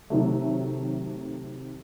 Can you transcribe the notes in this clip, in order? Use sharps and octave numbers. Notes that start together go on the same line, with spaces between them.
C3 D#3 F#3 A3